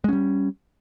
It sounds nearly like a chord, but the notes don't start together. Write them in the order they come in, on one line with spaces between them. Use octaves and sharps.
G#3 C#4 G3